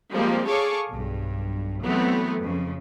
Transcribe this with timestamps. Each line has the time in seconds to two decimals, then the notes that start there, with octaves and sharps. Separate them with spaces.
0.12 F3 G3 G#3 A#3 C4 G4
0.48 G#4 A4 C#5 F5 C#6 D6
0.90 B1 G2
1.83 E3 F#3 A3 B3 C4
2.41 F2 C#3